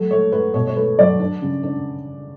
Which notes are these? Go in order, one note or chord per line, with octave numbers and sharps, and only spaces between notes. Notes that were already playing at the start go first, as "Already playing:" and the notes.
Already playing: F#3 A3
A3 C#5
A3 B4
B2 C#5
C#5
A3 B4
F#3 D5
D4
C#3
D4